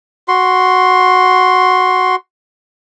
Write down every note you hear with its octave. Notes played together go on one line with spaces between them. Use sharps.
F#4 C6